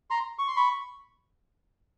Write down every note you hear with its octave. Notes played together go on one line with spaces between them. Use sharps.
A#5 C6
C#6
C6
B5 C#6